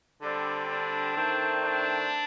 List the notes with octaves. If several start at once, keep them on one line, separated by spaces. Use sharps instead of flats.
D3 G3 C4 D4
D4
D#3 A3 C4
D4